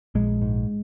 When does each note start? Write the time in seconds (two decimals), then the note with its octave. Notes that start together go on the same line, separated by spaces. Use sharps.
0.15 A#1 G#3
0.42 G#2